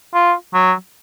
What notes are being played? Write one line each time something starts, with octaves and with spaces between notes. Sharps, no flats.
F4
F#3